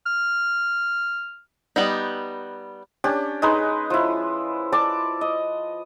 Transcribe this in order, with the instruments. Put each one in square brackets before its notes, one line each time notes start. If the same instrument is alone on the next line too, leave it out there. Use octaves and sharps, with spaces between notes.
[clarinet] F6
[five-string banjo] G3 B3 D#4
[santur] C#4 D4 G4
G#3 D#4 B4
F3 E4
D5 A5 D6
D#5